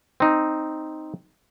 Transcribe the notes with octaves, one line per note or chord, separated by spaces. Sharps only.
C4 D#4